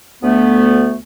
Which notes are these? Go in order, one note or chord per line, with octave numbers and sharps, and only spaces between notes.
D2 A3 B3